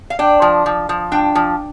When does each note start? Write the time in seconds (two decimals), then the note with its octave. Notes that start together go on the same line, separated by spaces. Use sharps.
0.10 F5
0.19 D4 G5
0.42 F3
0.66 F3
0.89 F3
1.12 D4 G5
1.35 F3